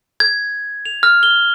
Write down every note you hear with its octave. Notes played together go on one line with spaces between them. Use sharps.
G#6
F7
F6
G7